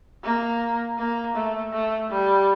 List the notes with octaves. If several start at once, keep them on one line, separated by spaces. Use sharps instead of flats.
A#3
A#3
A3
A3
G3